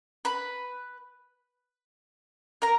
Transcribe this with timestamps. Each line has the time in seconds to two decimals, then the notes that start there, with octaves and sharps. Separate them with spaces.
0.25 B4 B5
2.62 A#4 A#5